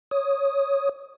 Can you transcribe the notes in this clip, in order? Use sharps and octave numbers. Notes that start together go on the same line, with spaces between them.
C#5 D#6